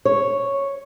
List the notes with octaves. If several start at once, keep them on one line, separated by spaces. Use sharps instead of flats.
C#5